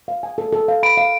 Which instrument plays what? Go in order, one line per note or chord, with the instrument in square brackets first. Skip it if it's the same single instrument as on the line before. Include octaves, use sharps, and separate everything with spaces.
[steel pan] F5
G#5
A4
A4
F5
[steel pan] B5 [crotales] D7
[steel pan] F5